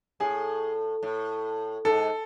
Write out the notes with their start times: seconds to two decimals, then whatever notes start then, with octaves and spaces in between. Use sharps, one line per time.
0.20 A2 G#4
1.03 A2
1.85 G#2 A4